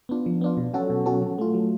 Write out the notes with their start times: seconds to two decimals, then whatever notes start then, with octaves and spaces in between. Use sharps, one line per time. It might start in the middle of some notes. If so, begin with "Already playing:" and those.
0.09 B3 D4 F4
0.26 F3
0.41 B3 D4 F4
0.57 B2
0.74 F#3 C#4 F#4 A4
0.90 B2
1.06 F#3 C#4 F#4 A4
1.22 F#3
1.38 A3 F4
1.54 F#3